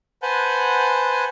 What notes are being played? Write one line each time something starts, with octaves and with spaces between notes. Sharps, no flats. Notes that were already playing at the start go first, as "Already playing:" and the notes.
B4 C5 F#5 G#5 A5 G6